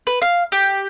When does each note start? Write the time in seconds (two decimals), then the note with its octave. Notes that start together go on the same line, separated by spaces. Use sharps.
0.07 B4
0.22 F5
0.52 G4